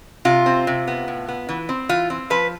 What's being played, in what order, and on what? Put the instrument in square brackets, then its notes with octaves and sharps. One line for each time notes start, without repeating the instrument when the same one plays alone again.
[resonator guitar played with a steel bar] C3 F4
C4
C3
B3
A2
B3
E3
C4
E3 F4
C4
F3 B4